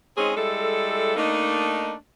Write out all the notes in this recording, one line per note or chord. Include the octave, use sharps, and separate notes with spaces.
G#3 C4 C#4 D#4 G#4
G3 G#3 E4 A4
A3 A#3 D4 D#4